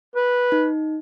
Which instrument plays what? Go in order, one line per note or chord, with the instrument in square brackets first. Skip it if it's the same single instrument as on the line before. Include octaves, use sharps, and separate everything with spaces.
[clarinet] B4
[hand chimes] D#4